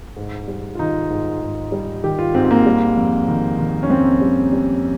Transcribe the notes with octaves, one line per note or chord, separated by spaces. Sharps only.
G#2
G3
F4
D#3 D#4
G#2
G#2
G3
D#3 G4
F4
G#2 C4
C4
A#3
G3
F2
D#3
D#3
C#4
F2 C4
G3
G3